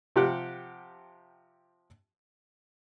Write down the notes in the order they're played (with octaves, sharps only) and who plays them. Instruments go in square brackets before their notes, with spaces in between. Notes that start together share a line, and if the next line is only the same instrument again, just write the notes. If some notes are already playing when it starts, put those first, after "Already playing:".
[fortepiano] C3 F3 G4 F#5